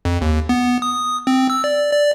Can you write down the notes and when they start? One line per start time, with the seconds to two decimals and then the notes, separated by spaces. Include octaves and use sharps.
0.05 F2
0.21 D#2
0.49 B3
0.82 D#6
1.27 C4
1.50 E6
1.64 D5
1.92 D5